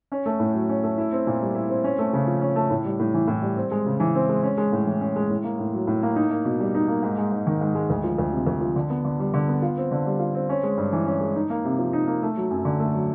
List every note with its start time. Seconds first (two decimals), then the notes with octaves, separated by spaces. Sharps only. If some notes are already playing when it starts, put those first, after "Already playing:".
0.12 C#4
0.26 A3
0.40 A2
0.54 F#3
0.69 C#4
0.83 A3
0.98 E4
1.12 C4
1.27 A#2
1.41 G3
1.55 E4
1.70 C4
1.84 C#4
1.99 A3
2.13 C#3
2.27 F3
2.41 C#4
2.56 A3
2.70 A2
2.85 G3
2.99 A2
3.14 E3
3.28 A2
3.42 G3
3.57 C4
3.71 G#3
3.86 C#3
4.00 E3
4.15 C4
4.29 G#3
4.43 C#4
4.57 G#3
4.72 A2
4.86 E3
5.01 C#4
5.16 G#3
5.30 A2
5.44 A#3
5.59 A2
5.74 F#3
5.87 A2
6.03 A#3
6.16 D#4
6.30 A#3
6.45 B2
6.60 G3
6.75 D#4
6.88 A#3
7.02 G#2
7.18 G#3
7.31 G#2
7.47 D#3
7.61 G#2
7.75 G#3
7.90 D2
8.04 F3
8.18 D2
8.32 C3
8.47 D2
8.61 F3
8.76 D3
8.90 B3
9.05 D3
9.19 G3
9.34 D3
9.48 B3
9.62 F4
9.77 C4
9.91 D3
10.06 G3
10.20 F4
10.35 C4
10.49 C#4
10.63 G#3
10.77 G2
10.93 E3
11.06 C#4
11.20 G#3
11.35 D#4
11.50 A#3
11.65 C3
11.79 F3
11.93 D#4
12.07 A#3
12.22 A3
12.37 F#3
12.50 F#2
12.65 D3
12.80 A3
12.94 F#3